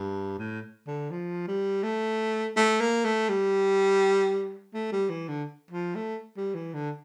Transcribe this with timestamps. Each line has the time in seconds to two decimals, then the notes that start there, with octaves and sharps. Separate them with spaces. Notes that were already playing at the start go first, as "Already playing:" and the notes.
Already playing: G2
0.38 A2
0.87 D3
1.11 F3
1.47 G3
1.83 A3
2.56 A3
2.80 A#3
3.05 A3
3.29 G3
4.74 A3
4.92 G3
5.10 E3
5.28 D3
5.71 F3
5.95 A3
6.37 G3
6.55 E3
6.73 D3